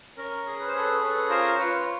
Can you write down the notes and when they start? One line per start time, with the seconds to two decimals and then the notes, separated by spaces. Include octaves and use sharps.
0.17 C#4 A#4
0.46 G#4
0.60 B4
0.68 C5
0.73 G#4 A4 B4
1.01 C#4 A4 B4
1.29 F4 A#4 C5
1.58 F4 B4 C#5